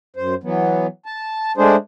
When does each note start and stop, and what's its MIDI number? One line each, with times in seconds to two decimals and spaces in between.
0.16 0.35 42
0.16 0.35 72
0.43 0.87 52
0.43 0.87 54
0.43 0.87 59
1.06 1.52 81
1.57 1.76 56
1.57 1.76 57
1.57 1.76 62
1.57 1.76 68
1.57 1.76 72